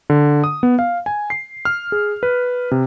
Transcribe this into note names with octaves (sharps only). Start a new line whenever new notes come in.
D3
D#6
B3
F5
G#5
C7
F6
G#4
B4
C3